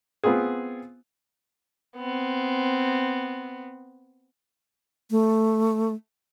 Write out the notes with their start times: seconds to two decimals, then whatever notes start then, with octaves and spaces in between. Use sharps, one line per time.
0.24 B3 C4 F4 G#4
1.97 B3 C4
5.11 A3